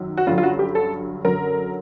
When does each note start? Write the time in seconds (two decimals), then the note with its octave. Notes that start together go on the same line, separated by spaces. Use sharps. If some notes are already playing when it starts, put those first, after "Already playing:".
Already playing: F#2 D#3 F#3
0.17 F#4
0.27 G2 D3 F#3 F4
0.38 F4
0.43 F#4
0.59 G4
0.75 A4
1.24 F#2 D3 F#3 A#4